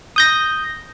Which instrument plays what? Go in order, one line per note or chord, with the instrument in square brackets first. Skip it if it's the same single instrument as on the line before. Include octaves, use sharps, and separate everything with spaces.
[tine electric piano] D#6 G6 A#6